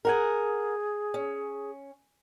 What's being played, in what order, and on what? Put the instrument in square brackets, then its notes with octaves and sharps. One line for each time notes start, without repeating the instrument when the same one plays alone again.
[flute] G#4 [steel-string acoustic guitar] A#4 F#5 G#5
[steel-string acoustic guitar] C#4